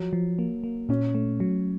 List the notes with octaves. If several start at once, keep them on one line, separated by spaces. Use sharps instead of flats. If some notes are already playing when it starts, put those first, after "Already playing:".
Already playing: F3 F#3
F3
A#3
A#3
A#2 C#4
A3
F#3